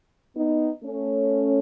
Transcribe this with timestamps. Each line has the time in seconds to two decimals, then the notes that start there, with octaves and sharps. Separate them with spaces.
0.36 B3 D#4
0.84 A3 C#4